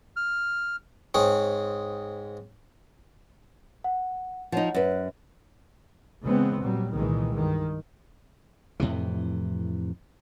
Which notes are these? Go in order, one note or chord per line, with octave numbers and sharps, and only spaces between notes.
F6
G#2 C4 G#4 C#5
F#5
F3 D#4 C#5 F#5
F#2 B4
C#3 E3 G#3 B3 C4
A#2 F#3 G3
C2 A#2 D#3 E3 G#3
G2 D#3
F2 A2 C3 E3